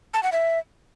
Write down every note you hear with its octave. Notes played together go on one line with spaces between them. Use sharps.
A5
F#5
E5